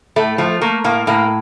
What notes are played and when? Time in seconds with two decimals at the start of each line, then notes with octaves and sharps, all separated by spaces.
0.16 A2 A3
0.38 F3 A3
0.61 A3 A#3
0.84 A2 A#3
1.07 A2 A#3